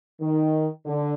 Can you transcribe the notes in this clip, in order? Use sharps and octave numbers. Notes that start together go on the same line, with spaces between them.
D#3
D3